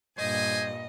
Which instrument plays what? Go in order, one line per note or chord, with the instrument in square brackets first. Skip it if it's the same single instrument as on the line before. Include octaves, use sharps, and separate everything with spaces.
[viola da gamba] G2 A#2 [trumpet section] C5 G#5 [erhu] D#5